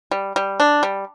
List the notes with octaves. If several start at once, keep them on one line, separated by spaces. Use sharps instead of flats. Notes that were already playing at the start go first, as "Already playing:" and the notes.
G3
G3
D4
G3